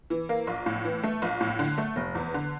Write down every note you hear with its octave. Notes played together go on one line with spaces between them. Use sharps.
E3
A#3
A#1
A2
E3
A3
A#1
A2
D3
A3
F1
E2
D3